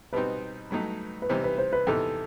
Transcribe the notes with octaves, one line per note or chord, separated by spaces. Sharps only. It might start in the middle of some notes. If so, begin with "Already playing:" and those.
B2 G3 C4 D#4 B4
G2 F#3 A3 D#4
B4
C3 E3 G3 D#4 C5
B4
C5
B4
E2 C3 E3 B3 D#4 A4